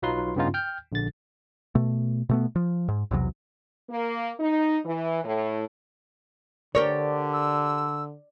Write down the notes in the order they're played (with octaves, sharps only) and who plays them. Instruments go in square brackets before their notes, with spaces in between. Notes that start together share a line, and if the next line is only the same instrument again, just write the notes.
[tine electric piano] B1 F#3 D#4 F4 B4 C6
G2 C#3 B3 C#4 D#4 F4
G5 F6 G6
A#1 D3 A6
[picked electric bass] B2 A3
B2 A3 B3
F3
G#2
B1 E2 C3 F#3
[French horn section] A#3
D#4
E3
A2
[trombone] D3 [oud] G4 A#4 C#5 [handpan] D5
[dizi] E6